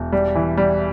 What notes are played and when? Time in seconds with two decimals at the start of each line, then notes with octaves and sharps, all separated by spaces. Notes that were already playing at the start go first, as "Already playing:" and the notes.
Already playing: E1
0.12 G3
0.35 E3
0.57 G3